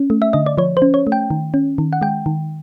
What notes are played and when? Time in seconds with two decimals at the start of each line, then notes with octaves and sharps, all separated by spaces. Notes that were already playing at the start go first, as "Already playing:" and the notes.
Already playing: C#4
0.10 A3
0.22 E5
0.33 D3 D#5
0.46 D5
0.58 F3 C#5
0.77 C5
0.82 C#4
0.94 C#5
1.07 A3
1.12 G5
1.30 D#3
1.54 C#4
1.78 D#3
1.93 F#5
2.01 G#3 G5
2.26 D#3